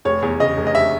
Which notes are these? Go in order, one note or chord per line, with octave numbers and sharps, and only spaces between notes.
F1 C#5
E2
C#3 D#5
F1
D#5
E5